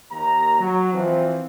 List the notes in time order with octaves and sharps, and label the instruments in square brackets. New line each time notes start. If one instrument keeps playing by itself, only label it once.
[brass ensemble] D#2 A#5
F#3
E3 F3 C4